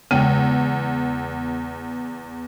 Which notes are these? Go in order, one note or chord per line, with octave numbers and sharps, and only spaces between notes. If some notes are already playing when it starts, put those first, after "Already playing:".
E2 C#3 G#3 G5